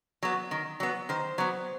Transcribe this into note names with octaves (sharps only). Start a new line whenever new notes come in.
F#3 B3
D#3
F#3 B3
D#3 C5
F#3 B3